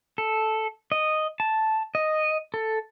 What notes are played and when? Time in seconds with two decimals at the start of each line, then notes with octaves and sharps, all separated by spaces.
0.18 A4
0.92 D#5
1.40 A5
1.95 D#5
2.54 A4